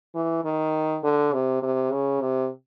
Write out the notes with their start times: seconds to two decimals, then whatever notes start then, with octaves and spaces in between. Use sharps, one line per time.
0.15 E3
0.45 D#3
1.04 D3
1.33 C3
1.62 C3
1.92 C#3
2.21 C3